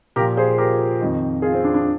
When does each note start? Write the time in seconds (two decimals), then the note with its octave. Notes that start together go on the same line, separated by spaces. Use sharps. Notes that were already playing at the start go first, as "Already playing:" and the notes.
0.16 A#2 G4 A#4
0.21 F3
0.37 G#4 C5
0.58 G4 A#4
1.00 F2 D#3
1.42 F4 G#4
1.53 C4
1.64 D4
1.74 D4